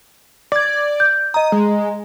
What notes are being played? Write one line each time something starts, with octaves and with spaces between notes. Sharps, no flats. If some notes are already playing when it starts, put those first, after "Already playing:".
D5 D6 G#6
G6
D#5 A#5 D#6
G#3